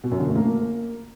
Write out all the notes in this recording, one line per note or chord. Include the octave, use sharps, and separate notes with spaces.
B2
F#2
D3
A3
A#3